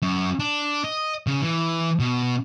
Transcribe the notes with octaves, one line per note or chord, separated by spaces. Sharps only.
F#2
D4
D#5
C#3
E3
B2